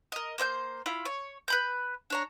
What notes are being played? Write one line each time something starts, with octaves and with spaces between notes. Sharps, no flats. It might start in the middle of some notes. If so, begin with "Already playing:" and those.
A#4 D#5
A#3 C5 E5 G6
E4 F4 B5
C#5
B4 B5 G6
D4 C#5 A#5